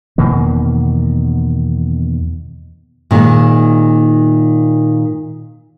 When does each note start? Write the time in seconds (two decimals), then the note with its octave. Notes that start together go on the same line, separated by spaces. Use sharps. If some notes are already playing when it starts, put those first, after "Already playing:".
0.18 E2 B2 D#3 A#3
3.11 A#2 D#3 G#3